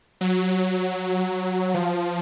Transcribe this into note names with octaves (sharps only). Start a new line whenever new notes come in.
F#3
F3